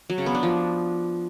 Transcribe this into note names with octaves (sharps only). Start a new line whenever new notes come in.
F#3
C#3
B3
D4
F3